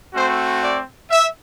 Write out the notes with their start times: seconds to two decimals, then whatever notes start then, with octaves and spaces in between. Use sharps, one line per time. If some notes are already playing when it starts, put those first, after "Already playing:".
0.14 A3 C4 F#4 C5
0.62 D5
1.11 E5